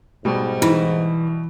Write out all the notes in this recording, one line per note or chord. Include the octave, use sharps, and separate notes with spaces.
G#2 B2 G3
E3 D#4 E4